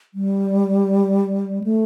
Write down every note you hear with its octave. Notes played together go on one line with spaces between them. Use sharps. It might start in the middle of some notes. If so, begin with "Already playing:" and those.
G3
A3